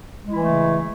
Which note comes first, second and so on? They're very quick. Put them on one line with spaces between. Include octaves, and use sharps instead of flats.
G#3 E4 E3 A3 C#3